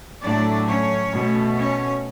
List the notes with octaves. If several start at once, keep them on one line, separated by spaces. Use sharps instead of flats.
A2 F#3 A3 D4 D5
C#4 C#5
B2 A3
C#4 C#5